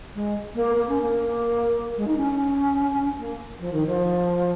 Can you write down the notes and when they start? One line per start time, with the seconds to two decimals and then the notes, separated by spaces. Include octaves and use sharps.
0.15 G#3
0.55 A#3
0.75 A#3
0.89 C#4
1.02 A#3
1.97 G#3
2.07 D#4
2.17 C#4
3.19 A#3
3.60 F3
3.73 D#3
3.86 F3